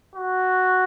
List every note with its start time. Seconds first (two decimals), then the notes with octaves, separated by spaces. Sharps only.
0.15 F#4